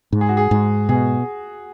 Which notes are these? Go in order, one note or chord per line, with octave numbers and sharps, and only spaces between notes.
G#2
G#4
F#4
G#4
G#2
B2 G#4